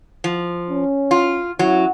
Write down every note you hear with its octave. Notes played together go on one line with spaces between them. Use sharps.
F3
C#4
F4
F#3 C#4 E4